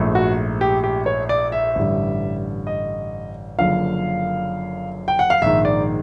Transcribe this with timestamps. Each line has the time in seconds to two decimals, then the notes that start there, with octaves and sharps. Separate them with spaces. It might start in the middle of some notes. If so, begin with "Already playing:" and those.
Already playing: A#1 G#2 F3 A3
0.15 F#4
0.61 G4
0.84 G4
1.06 C#5
1.29 D5
1.52 E5
1.75 A1 G2 D3 G3
2.67 D#5
3.58 F#1 F#2 D3 F3 F5
5.08 G5
5.19 F#5
5.30 F5
5.42 A#1 G#2 D#3 E5
5.65 D5